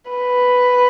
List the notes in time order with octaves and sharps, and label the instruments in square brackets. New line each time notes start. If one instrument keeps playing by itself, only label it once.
[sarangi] B4